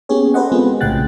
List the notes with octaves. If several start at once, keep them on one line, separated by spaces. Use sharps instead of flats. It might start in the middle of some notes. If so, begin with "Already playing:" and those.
A#3 B3 C#4 G4 G#4 C#5
G4 A4 B4 C5 D#5 F#5
G#3 B3 C4 F4 G#4
B1 A2 C#3 G5 F#6 A6